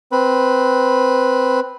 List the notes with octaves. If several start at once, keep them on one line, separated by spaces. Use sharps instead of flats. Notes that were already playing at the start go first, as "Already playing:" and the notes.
C4 B4